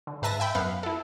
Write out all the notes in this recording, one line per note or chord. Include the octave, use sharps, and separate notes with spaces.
D3
G#2 B4 E5 A5 A#6
E5 G5 B5
F#2 B3 F5 F#5
E4 A4